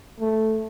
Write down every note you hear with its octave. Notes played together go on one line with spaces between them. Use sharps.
A3